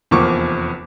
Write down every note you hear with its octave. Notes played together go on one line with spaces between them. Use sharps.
F1 E2 F3 A#3 C#6 D6